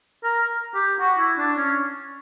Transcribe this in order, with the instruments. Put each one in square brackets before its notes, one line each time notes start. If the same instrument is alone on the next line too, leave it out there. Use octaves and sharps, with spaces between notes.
[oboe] A#4
G4
F#4
E4
D4
C#4